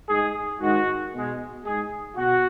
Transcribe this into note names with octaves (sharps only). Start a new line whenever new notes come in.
G#2 G#3 G#4
G#2 D#3 G#3 F#4
B2 G#3
G#2 G#3 G#4
B2 F#4